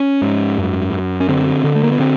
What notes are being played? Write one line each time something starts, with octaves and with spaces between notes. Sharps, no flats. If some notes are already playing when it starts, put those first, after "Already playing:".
Already playing: C#4
G#2
F#2
F#2
C#4
D3 C4
D3
A3
A#3
B3
D3 C4